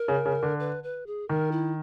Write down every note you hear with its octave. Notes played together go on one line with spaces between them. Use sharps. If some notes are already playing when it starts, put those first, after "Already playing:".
Already playing: A#4
C#3
C#3
D3
B4
B4
G#4
D#3 A#4
E4